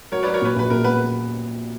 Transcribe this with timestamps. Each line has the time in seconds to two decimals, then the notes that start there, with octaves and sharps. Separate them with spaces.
0.12 F#3 A#4 C#5
0.23 F#3 B4 D5
0.34 A#4 C#5
0.42 A#2 B4
0.56 A#1 B4
0.70 A#1 A#4
0.84 B3 B4